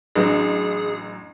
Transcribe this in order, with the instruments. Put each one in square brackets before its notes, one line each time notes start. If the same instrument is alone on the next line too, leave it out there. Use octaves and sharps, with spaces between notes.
[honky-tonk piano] A1 F#3 [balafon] D4 B4 [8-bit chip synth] G#4